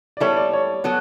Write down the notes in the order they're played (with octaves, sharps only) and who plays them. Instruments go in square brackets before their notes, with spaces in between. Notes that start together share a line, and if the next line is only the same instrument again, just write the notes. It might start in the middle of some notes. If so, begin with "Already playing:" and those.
[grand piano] D5
[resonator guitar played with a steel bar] G3 B3 E4 A4 [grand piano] C#5
[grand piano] D5
C#5
[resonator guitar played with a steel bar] F#3 B3 F#4 A4